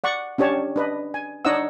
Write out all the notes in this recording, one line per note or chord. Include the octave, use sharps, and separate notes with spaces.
D5 F#5 C#6
C#4 D4 G4 C#5 A5
D4 B4 D#5
G#5
D4 D#4 C#5 D#5 F#5 E6